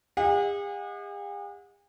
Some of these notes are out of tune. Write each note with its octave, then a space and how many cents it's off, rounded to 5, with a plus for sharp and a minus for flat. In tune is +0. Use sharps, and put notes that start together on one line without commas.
G#4 -45 D#5 +35 F#5 -35